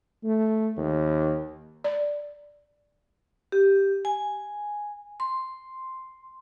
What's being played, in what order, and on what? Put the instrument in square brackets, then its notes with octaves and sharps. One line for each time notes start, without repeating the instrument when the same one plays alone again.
[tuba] A3
D#2
[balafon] D5
[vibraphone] G4
G#5
C6